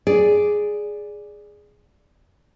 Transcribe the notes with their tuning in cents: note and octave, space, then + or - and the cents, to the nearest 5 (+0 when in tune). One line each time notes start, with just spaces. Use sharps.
G#4 +0 D5 +0